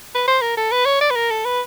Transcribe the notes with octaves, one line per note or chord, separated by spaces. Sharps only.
B4
C5
A#4
A4
B4
C#5
D5
B4
A#4
A4
B4